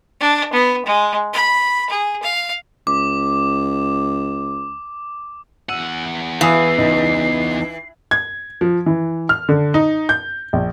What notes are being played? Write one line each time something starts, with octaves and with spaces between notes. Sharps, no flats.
D4
B3
G#3
B5
G#4
F5
C#2 D6
E2 F#5 E6 D#7
E3 F5 G#5 D#6 C7
C#2 D#4
G#6
F3
E3
F6
D3
D#4
G6
A#1